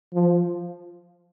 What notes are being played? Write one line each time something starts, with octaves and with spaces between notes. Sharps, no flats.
F3